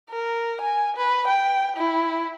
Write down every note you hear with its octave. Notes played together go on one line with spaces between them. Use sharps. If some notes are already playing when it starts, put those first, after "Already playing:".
A#4
G#5
B4
G5
E4